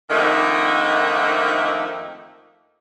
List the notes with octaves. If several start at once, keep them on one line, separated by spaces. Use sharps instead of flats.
F2 D3 D#3 A3 A#3 D#4